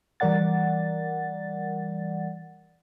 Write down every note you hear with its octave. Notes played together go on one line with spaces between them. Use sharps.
E3 G3 A#4 D5 F#5 A6